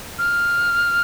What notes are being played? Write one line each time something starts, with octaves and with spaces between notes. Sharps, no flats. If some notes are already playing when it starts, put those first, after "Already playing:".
F6